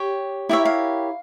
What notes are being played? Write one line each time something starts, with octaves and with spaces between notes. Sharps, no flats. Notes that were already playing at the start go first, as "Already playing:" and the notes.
Already playing: G4 C#5
E4 G4 A#4 C#5 E5
F5